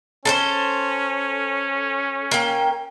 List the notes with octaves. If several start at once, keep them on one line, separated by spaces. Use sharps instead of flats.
C#4 A4 A#4 C5
A#3 G5